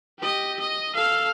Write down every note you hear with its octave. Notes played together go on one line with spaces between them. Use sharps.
G4 D#5
D#5
A4 F5